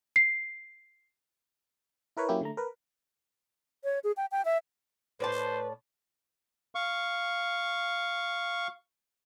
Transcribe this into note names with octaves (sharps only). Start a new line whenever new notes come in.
C7
E4 A#4 B4 C#5
F#3 A#3 C#4 E4 G4
D3 A3 A#5
A#4 B4
C#5
G#4
G5
G5
E5
A2 B4 C5 D5 A5
F5 C#6